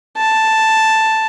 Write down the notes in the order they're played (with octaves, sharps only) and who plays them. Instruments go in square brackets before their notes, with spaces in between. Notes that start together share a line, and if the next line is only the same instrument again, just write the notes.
[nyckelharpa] A5